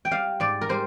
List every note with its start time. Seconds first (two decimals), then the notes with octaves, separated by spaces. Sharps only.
0.05 G5
0.11 G3 F5
0.40 G#2 D5
0.61 A#4
0.69 G3 C5